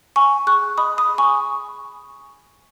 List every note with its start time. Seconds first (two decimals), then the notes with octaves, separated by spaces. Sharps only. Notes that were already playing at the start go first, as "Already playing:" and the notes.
0.16 F#5 G#5 C#6
0.47 G#4 C#6 F#6
0.77 D#5 B5 D#6
0.98 B5 D#6
1.09 G#4
1.18 G#5 C#6